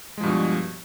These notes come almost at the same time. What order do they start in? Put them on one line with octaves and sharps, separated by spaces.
G#3 F3 G2 B2